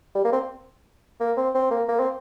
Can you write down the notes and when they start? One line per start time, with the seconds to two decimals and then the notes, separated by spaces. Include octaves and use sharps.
0.15 G3
0.24 A#3
0.32 C4
1.20 A#3
1.37 C4
1.54 C4
1.70 A#3
1.89 A#3
2.00 C4